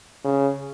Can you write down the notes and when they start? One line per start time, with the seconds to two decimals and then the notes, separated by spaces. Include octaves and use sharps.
0.25 C#3